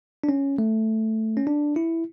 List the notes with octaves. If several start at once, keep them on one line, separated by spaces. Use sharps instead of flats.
D4
C#4
A3
C#4
D4
E4